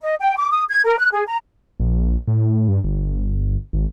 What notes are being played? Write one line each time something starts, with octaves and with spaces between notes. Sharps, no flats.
D#5
G5
D6
D#6
G#6
A#4
F#6
G#4
A#5
A#1
A2
G2
G1
G#1